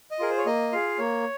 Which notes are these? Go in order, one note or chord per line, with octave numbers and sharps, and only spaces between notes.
D#5
F4 G#4 A#4
C5
C#5
A#3 D#5
F4 G#4 F5
A#3 C#5